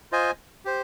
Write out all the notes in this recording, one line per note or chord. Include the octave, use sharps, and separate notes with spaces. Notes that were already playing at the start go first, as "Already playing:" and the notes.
F4 C5 D#5 G#5
G4 C5